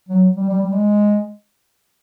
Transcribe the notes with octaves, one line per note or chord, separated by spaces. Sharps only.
F#3
G3
G3
G3
G#3